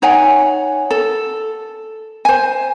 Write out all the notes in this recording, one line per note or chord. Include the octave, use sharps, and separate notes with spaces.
D#4 C#5 F#5 G#5
A4
C5 G#5